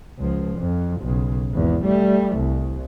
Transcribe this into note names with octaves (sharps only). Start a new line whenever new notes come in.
C#2 F3
F2
B1 C#3
G#1 E2
G3 A3
C2